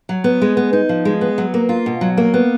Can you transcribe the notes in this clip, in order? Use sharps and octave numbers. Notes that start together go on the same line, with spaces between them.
F#3
B3
G#3
B3
D#4
F3
G#3
B3
F#3
A#3
F4
B2
F#3
A#3
B3